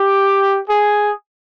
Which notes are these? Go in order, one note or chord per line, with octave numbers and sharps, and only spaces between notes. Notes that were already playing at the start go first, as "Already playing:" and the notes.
Already playing: G4
G#4